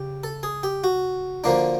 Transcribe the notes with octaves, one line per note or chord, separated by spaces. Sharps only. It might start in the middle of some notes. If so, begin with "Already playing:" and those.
Already playing: C#3 G4
A4
G#4
G4
F#4
D3 F3 A#3 D4